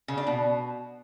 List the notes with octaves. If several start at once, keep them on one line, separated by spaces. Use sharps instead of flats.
C#3
D4
B2